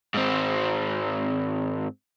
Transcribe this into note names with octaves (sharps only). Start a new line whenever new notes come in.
G#2 C4